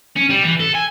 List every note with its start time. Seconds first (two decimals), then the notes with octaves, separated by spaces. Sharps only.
0.16 C#4
0.30 G3
0.44 E3
0.60 A4
0.75 G#5